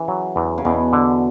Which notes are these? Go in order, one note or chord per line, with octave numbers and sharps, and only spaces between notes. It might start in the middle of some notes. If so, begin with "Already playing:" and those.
Already playing: C#3 E3
F#3
E2
C#3
E2 B2
D3